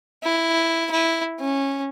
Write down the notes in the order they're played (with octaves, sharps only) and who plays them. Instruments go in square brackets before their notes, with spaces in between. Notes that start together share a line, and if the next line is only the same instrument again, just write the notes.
[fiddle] E4
E4
C#4